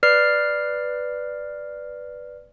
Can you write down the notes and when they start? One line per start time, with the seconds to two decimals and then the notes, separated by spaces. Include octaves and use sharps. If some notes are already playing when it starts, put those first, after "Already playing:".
0.03 B4 D5 F6 C7